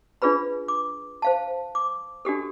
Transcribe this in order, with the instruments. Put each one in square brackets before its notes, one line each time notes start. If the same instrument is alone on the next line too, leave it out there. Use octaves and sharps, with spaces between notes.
[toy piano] D4 F4 G#4 B4 B5
D6
C5 F5 A5
D6
D4 F#4 G4 A4